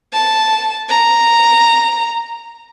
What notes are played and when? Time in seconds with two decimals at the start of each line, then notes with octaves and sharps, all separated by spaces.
0.13 A5
0.89 A#5